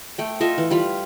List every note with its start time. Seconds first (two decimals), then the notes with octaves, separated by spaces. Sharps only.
0.18 A3 G5
0.40 F4 A4 D#5 E5
0.58 E3
0.70 G3 F4 B5